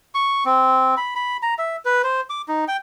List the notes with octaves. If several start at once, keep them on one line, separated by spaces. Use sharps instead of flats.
C#6
C4
B5
B5
A#5
E5
B4
C5
D6
D#4
G5